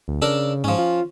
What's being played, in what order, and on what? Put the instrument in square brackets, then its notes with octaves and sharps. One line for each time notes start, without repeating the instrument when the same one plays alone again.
[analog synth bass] D2
[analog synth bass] C#3 [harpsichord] D4 A4 A#4
[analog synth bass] G#2 [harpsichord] F3 C#4
[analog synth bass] F4